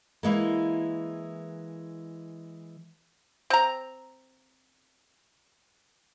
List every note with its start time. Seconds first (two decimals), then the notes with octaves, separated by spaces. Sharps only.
0.23 E3 G#3 A#3
3.50 C4 A#5